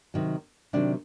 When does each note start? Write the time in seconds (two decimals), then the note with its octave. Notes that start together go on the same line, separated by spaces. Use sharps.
0.14 C3 D#3 F#3
0.73 C3 D#3 F#3 D4